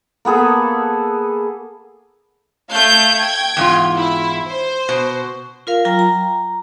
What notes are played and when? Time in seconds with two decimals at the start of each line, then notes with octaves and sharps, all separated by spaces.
0.25 A#3 B3 G#4 A4
2.69 A3 F5 G6
3.18 G5 G#6
3.57 E2 G#2 F4
3.96 E4
4.48 C5
4.89 B2
5.67 F4 A#4 F5
5.85 F#3 F4 G5 A#5
5.99 A#5